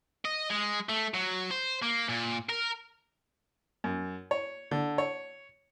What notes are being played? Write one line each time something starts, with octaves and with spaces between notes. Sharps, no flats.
D#5
G#3
A3
F#3
C5
A#3
A#2
A#4
F#2
C#5
D3
C#5